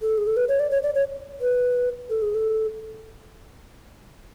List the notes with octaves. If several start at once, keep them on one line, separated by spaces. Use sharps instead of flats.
A4
G#4
A4
B4
C#5
D5
C#5
D5
C#5
B4
A4
G#4
A4